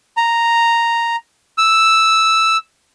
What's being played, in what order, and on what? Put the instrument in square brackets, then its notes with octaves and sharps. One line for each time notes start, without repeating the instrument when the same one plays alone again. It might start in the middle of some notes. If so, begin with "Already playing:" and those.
[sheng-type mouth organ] A#5
E6